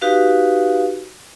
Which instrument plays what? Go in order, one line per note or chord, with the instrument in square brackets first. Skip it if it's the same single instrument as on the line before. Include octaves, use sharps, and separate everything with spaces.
[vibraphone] D#4 F#4 G4 B4 F5